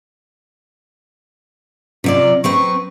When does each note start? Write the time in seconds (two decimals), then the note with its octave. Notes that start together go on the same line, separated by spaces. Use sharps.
2.04 C3 F#3 F4 D5
2.44 F#3 C4 B4 C#6